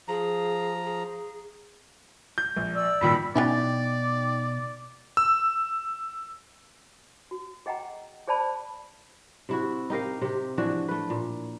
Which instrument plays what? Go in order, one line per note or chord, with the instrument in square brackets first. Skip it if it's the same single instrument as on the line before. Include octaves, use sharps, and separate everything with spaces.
[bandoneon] F3 A#5 [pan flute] G#4
[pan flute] G#4
[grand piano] G6
A#1
[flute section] D5 E6
[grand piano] G2 A#2 D#3 [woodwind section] B5
[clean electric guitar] B2 [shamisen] F#3 C#4 E4 [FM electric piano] D#4 G5 A6 [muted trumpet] D5
[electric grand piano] E6
[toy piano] F#4
G#4 D#5 F#5 G5 A#5
G#4 C5 D5 A5 B5
[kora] C3 E4 F#4
D#4 G4 A#4 F5
C3 G4
E3 F3 D4 F#4
A3 B4
A#2